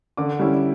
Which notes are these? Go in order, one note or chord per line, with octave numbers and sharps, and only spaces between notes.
D3 D6
G3 C#4 E4